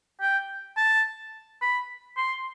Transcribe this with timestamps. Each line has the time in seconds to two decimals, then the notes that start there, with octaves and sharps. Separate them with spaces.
0.21 G5
0.77 A5
1.62 B5
2.17 C6